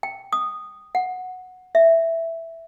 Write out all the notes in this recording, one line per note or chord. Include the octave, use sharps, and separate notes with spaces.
G5
D#6
F#5
E5